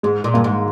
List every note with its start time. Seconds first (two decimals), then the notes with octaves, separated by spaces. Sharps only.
0.03 G#2 G#3
0.24 A#2
0.34 G2 A#3
0.44 G#2